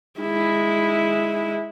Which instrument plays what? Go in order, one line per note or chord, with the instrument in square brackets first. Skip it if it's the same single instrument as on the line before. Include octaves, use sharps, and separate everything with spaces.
[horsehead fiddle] G#3 E4